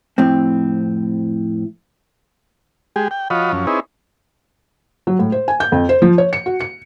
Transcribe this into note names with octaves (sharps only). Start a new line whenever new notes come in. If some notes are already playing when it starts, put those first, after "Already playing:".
F2 A2 C4
G#3 G4 G#4
G5
F3 F4 F#4 C#5 D#5 B5
F#2 F3 C#4
C4 D#4 E4 G#4 B4 C#5
F#3
A2
C5
G#5
G6
F2
C5
F3
C#5
C#7
F#4
C#7